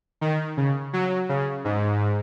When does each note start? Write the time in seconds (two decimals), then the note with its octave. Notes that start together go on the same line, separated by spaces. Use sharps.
0.21 D#3
0.57 C#3
0.93 F#3
1.29 C#3
1.65 G#2